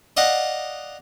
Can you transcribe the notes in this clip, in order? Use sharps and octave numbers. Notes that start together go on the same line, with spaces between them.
D5 D#5 F5 F#5